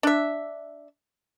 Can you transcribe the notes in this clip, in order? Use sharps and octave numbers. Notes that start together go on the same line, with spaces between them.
D4 E5